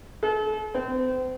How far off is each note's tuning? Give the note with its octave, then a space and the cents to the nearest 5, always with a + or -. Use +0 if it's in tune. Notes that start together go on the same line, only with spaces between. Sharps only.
A4 -45
C4 -35